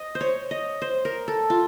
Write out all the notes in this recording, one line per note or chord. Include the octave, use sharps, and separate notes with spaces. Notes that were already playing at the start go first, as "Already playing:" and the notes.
Already playing: D#5
C5
C#5
D#5
C5
A#4
A4
F4